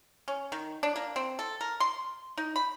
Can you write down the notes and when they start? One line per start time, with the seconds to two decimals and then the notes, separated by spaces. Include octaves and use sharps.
0.28 C#4
0.52 D#3
0.83 D4
0.96 A#3
1.16 C4
1.39 A4
1.61 A#4
1.80 C6
2.38 D#4
2.56 B5